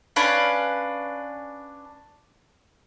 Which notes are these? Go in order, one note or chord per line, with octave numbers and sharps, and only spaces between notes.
C#4 D4 B4 F5